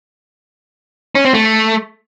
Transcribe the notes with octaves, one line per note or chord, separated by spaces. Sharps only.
C#4
C4
A3